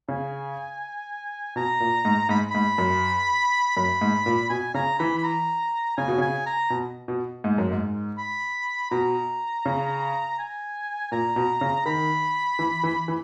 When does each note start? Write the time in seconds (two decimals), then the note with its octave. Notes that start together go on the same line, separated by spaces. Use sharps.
0.09 C#3 G#5
1.56 B2 A#5
1.80 A#2
2.05 G#2
2.29 G#2 B5
2.51 G#2 B5
2.78 F#2
3.77 F#2 B5
4.01 G#2
4.26 A#2
4.50 B2 G#5
4.74 C#3 A#5
4.99 E3 B5
5.18 B5
5.24 A#5
5.97 C#3 G#5
6.08 B2
6.18 C#3 G#5
6.47 A#5
6.70 B2
7.08 B2
7.44 G#2
7.58 F#2
7.71 G#2
8.18 B5
8.91 B2 A#5
9.66 C#3
10.39 G#5
11.12 A#2 A#5
11.36 B2
11.61 C#3
11.86 D#3 B5
12.59 E3
12.83 E3
13.08 E3